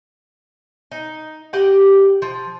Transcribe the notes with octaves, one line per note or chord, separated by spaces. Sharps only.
D#4
G4 D#5 F#5
F3